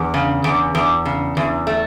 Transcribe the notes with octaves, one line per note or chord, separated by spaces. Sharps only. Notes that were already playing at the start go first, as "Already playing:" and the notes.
Already playing: E2
C#3
E2
E2
C#3
E2
A3